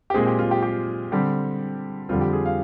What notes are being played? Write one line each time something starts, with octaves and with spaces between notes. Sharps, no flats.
G4
A#2 G#3 C4 G#4
G4
F4
G4
G4
D3 G3 C4 G4
F2 D3 G3 C4 F4
G4
G#4
F5